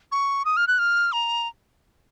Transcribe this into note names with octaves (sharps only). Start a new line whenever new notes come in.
C#6
D#6
F6
F#6
F6
A#5